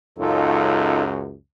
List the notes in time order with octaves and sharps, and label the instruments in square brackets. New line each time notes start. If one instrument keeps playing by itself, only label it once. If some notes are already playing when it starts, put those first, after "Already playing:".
[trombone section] C#2 F#2 [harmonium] D#4 F4 A4